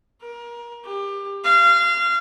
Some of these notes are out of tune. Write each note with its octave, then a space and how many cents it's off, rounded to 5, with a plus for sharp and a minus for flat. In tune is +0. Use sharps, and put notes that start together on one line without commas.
A#4 +25
G4 +25
F5 -25